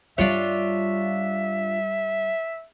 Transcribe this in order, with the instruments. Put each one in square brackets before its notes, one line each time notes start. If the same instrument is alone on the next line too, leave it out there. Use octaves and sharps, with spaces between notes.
[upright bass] G2 G3 [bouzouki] D4 F4 C#5 [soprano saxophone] E5